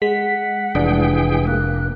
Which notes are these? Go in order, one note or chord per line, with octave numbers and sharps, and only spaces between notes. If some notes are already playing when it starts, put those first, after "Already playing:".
G#3 F#5 B6
F1 E3 D4 G#4 G5
A#3 F#6